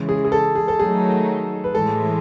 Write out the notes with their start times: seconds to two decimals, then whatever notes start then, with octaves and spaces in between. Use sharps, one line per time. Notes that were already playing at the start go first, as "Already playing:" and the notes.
Already playing: C#3 E3 G#3
0.09 G#4
0.25 G#4
0.32 A4
0.55 G#4
0.68 A4
0.79 D#3 F#3 A3 D#4 G#4
1.64 B4
1.74 A2 E3 G#3 A4